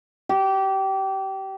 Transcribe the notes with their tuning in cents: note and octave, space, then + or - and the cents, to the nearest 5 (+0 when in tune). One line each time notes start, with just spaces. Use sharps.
G4 -25